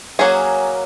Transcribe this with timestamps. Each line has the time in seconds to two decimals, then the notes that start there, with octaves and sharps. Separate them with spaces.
0.19 F#3 A#3 C#4 G#4